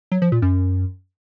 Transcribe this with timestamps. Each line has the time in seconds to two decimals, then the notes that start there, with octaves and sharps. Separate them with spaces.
0.12 F#3
0.22 F3
0.32 A#2
0.42 F#2